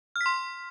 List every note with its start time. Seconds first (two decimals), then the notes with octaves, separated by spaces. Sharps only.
0.16 F6
0.21 B6
0.26 C6